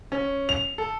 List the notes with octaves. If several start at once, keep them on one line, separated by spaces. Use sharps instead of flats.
C#4
F7
A4